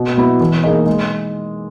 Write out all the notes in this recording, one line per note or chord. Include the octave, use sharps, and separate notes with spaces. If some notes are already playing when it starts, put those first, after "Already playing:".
Already playing: B2
F#3 B3 E4
E3
A#3 D#4 G#4 D#5
G#3